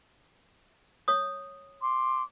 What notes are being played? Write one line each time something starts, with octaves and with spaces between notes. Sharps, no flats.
C#5 D#6
C6 D6